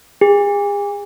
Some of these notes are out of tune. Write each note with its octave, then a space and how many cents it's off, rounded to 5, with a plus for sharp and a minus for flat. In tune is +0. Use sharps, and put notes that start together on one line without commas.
G#4 -40